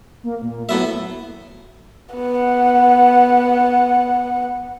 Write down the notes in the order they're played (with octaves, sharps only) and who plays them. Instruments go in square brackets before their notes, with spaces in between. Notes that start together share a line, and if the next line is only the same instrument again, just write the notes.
[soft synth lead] A#3
A#2
[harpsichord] A2 B3 E5 [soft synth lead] F#3
[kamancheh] B3 F#5